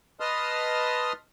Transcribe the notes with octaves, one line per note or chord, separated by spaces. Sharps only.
B4 D#5 A5 C6 D#6 F6